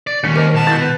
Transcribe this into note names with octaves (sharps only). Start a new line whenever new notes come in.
D5
D#2 D#3 G#3 C#4 C#7
A#4 C5 D#5 D6
B2 B3 A5
E4 G6 A6
B4